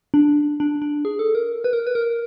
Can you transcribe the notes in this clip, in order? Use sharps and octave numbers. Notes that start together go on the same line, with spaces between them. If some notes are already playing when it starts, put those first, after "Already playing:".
D4
D4
D4
G#4
A4
A#4
B4
A#4
B4
A#4